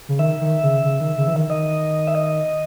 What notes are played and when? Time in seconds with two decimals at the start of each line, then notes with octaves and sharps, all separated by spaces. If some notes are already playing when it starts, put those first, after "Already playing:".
0.09 C#3
0.19 D#3 E5
0.41 D#3
0.63 C#3
0.85 C#3
1.00 D#3
1.17 C#3
1.27 E3
1.33 D#3
1.49 D#3 D#5
2.07 E5
2.15 D#5